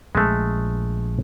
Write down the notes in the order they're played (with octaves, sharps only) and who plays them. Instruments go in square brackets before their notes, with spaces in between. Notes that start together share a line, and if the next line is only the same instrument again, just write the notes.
[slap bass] A#1 [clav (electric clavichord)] G#3 A3